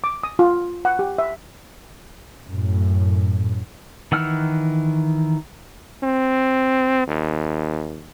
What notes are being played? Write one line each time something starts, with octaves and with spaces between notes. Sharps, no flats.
D6
D#6
F4
F#5
G4
E5
F#2 A2
D#3 E3 F#5 E6 F6
C4
D#2